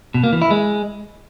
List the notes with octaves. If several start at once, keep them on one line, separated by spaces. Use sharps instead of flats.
B2
A#3
E3
E4
G#3